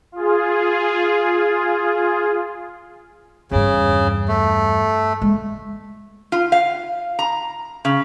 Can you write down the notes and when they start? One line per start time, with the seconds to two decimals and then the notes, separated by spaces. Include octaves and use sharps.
0.12 F4 G#4
3.51 E2 G2 C#3
4.28 A3
5.22 G#3 A#3
6.32 F4
6.52 F5
7.19 A#5
7.85 C#3